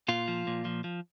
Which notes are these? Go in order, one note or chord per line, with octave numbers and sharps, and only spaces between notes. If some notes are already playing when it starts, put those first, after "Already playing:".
A#2 F4
F3
A#2
F3
F3